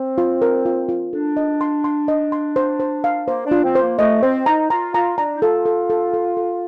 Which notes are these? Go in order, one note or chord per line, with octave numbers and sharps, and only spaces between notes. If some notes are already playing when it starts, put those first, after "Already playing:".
Already playing: C4
F4
A#4
F4
F4
D4 A4
D#5
C6
C6
D#5
C6
C5
C5
F5
A#3 C5
D4
F4
C4
C5
A#3
A3 D#5
C4 C5
D#4 A#5
F4 A#5
F4 A#5
D4 A#5
D#4
F4 A4
A4
A4
A4
A4